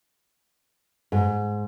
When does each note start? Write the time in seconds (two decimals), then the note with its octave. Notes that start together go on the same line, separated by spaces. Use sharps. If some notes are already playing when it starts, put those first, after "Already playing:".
1.12 G#2